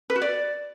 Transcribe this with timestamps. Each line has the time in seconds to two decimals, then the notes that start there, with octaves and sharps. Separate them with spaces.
0.10 B4
0.16 F#4
0.22 D5